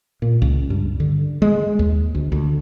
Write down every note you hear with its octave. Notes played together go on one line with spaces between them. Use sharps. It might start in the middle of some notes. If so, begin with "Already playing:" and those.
A#2
C#2
G2
D3
G#3
D#2
D2
D2